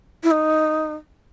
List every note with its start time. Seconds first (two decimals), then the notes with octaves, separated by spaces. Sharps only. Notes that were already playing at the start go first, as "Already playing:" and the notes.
0.23 E4
0.31 D#4